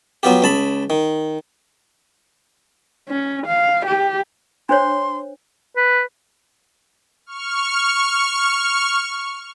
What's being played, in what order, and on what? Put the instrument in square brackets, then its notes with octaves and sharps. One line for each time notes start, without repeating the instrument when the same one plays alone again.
[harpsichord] F#3 B3 F4 G4
C#2 A5 B5
D#3
[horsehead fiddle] C#4
F5
G4
[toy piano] D4 C5 C#5 [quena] C6
[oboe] B4
[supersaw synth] C#6 F6